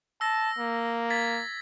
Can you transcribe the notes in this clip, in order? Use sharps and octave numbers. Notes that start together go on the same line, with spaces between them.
A5 E6 A#6
A#3
G#6 A6 B6